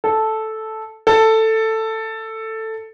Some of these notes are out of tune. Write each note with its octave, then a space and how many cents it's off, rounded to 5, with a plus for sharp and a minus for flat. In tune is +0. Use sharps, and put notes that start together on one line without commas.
A4 -5
A4 +10